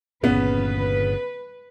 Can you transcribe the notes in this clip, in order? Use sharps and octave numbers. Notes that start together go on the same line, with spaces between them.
G1 A#2 C#3 B3 B4